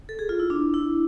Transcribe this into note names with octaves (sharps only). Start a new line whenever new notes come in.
A4
G#4
F4
E4
D4
E4